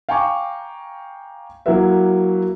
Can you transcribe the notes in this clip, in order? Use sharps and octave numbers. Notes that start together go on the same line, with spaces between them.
F5 G5 G#5 A#5 C#6 D6
F#3 A#3 E4 F#4 B4 E5